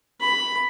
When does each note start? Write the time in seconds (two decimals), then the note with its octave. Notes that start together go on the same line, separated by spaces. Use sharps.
0.21 B5